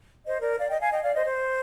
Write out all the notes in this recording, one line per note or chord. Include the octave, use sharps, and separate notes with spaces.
C5 D#5
A#4 D5
D5 F5
D#5 G5
F5 G#5
D#5 G5
D5 F5
C5 D#5
C5